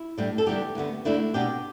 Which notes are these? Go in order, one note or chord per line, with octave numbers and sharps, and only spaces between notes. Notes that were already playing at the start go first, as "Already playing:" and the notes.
Already playing: E4
A2 G3 D4
A4
E2 D3 G3 B3 G4
D2 D3 B3
D2 D3 A3 D4 E4
B2 B3 D4 G4